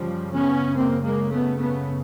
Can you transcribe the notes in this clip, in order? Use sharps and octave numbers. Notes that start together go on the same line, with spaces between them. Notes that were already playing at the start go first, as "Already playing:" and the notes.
Already playing: F#2 C#3 F3 G3
B3 C#4
A#3 C4
G#3 A#3
A3 B3
A3 B3